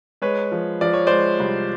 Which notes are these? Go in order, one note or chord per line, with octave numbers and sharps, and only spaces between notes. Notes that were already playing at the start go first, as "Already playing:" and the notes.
G#3 B4 C#5
F3
F3 D5
C#5
G#3 C5 D5
C2